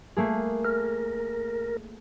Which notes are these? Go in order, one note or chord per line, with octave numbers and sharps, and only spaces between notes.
A3 A#3 G#4
A#4